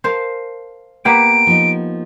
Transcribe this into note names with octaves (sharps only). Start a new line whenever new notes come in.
A#4 C5 F5 A5
A#3 B3 G4 D7
F3 D#4